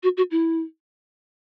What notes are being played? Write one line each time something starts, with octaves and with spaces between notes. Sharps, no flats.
F#4
F#4
E4